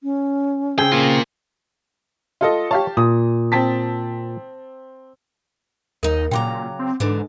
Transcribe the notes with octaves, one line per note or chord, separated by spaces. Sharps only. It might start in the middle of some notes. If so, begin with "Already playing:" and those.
C#4
C#3 C4 G#4 G5
A#3 F4
F4 A4 D#5
G4 C#5 F5 A5
A#2 D#6
C4 A5 B6
D#2 D#4 A#4 D#5
A#2 C#3 F#3 G5 A#5 C6 D6
C4
G#2 D3 E3 D4